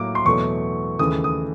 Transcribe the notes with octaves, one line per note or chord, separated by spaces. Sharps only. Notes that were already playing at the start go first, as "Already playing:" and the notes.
Already playing: A2 F#3 A#3 D6
C6
E2 B2 F#3 A3 C#6
D#2 C#3 E3 A3 D#6
D#6